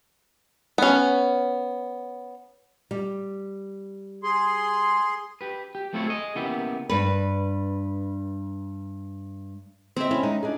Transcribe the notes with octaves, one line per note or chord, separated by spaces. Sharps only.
B3 C#4
G3
G#4 C6
G4 B4
G4
A3 C4 E4 F4 C#5
G#4 D#5
C#3 A#3 B3 E4 G4
G2 B4
C4 C5 D#5 E5
C#4 E4
G#3 D#4
D4 D#4 G#4